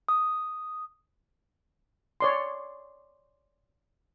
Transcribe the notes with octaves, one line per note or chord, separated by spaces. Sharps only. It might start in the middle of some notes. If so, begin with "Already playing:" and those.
D#6
C#5 D5 C6